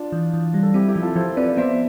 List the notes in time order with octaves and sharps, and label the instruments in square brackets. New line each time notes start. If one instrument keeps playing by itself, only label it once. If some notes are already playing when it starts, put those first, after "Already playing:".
Already playing: [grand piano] D4 F4
[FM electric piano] E3
E3
G3
[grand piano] A4
[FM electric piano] C4 [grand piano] E4 G4
[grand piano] E4 G4
[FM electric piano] F3
[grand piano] F4 A4
[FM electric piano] F3 [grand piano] A4 C5
[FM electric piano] C4 [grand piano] B4 D5
[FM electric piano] B3 [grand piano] C5 E5